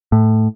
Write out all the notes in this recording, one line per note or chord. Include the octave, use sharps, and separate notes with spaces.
A2